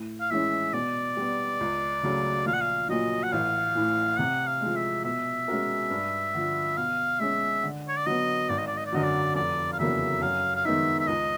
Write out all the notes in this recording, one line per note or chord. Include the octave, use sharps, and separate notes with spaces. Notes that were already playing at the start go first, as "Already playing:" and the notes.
Already playing: A2
F5
E3 G#3 C#4 E4 E5
B2 D5
G3 B3
C#2
C#3 F#3 A3
A#1 F5
F#5
F5
A#2 F#3 D#5
F#5
A1 F5
A2 E3
C3 F#5
F5
F3 G#3
E5
B2 E5
G#3 C#4 F#4 A#4
G2
D3 F3
B2 F5
G#3 C#4 E5
D3
C#5
D5
F#3 B3 D#5
G#1 D5
D#5
D5
D#5
D5
F#2 D3 F#3 D#5
D5
F1 D5
F5
E2 C#3 F#3 A#3 E5
F#2 F5
F5
D#3 G#3 B3 D#4 E5
E5
C#2 D#5